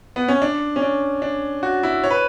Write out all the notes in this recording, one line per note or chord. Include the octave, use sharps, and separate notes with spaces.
B3
C#4
D4
C#4
D4
D4
F#4
E4
C#5
B4